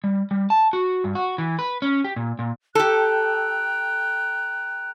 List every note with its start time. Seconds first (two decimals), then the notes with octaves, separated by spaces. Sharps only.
0.04 G3
0.31 G3
0.50 A5
0.73 F#4
1.04 G2
1.15 F#4
1.38 E3
1.59 B4
1.82 C#4
2.04 G4
2.16 A#2
2.39 A#2
2.75 G4 A4 G5 A#5 F#6